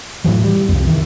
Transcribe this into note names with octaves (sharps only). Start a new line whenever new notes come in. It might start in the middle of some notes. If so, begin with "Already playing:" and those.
A2 C3 E3 F#3
G3
C2 F2
D#3 E3